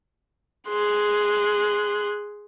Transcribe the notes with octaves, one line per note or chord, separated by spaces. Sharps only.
G#4 C6 F#6